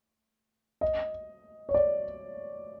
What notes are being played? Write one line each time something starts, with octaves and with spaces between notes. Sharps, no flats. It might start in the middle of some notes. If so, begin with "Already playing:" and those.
D#5
C#5
D5